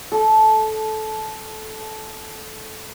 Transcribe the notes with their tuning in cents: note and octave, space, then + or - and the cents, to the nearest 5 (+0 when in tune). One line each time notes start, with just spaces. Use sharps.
A4 -15